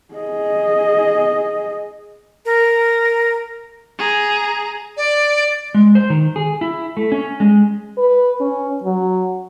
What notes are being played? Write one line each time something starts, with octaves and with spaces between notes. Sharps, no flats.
G#4 D#5
A#4
G#4 A#5
D5
G#3
C5
D#3
G#4
E4
A3
C#4
G#3
B4
C#4
F#3